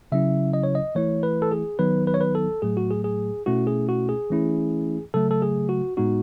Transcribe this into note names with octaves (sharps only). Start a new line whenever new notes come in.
C#3 F#3 C#4 E4 E5
D#5
C#5
D#5
E3 A3 E4 C#5
B4
A4
G#4
D#3 F#3 B3 D#4 B4
B4
C#5
B4
A4
A2 F#3 A3 G#4
F#4
G#4
G#4
B2 A3 C#4 E4 F#4
G#4
F#4
G#4
E3 A3 C#4 E4
C#3 F#3 A3 A4
A4
G#4
F#4
A2 G#3 B3 D#4 F#4